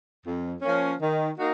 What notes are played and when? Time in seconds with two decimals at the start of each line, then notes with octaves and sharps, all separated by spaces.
0.25 F2
0.62 F3 A#3 C#4
1.00 D#3
1.37 A#3 D#4 F#4